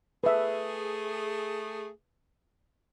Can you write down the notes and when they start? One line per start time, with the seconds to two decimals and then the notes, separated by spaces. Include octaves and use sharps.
0.24 A3 G#4 B4 E5